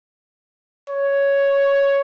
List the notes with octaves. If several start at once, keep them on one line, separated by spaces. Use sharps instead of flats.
C#5